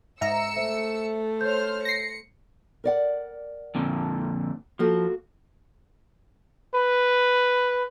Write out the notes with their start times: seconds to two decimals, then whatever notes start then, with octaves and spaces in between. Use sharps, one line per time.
0.21 G#2 E5 A#5 E6 C#7
0.56 A3 C5 E5
1.41 C5 C#5 F6 G6
1.85 A#6 C7 C#7
2.84 A#4 D5 F#5
3.75 F2 A#2 D3
4.79 F3 A#3 F#4 A4
6.75 B4